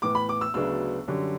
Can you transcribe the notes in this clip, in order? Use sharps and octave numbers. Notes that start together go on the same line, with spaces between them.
A2 E3 B3 D6
B5
D6
E6
D2 C#3 F#3 B3 D4 E6
F#2 D3 G3 C#4